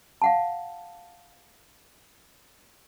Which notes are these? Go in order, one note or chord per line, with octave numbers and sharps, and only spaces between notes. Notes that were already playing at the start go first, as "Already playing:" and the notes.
F5 F#5 A5